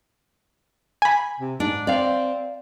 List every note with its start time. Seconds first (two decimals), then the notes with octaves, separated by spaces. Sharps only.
1.02 G#5 B5
1.40 C3
1.60 G#2 D4
1.87 C4 D5 F5